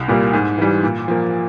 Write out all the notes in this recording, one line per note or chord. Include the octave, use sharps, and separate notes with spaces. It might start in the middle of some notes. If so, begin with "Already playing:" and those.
Already playing: C2
A#2 G3 A#3
G#2
E3 G3
A#2
F3 A#3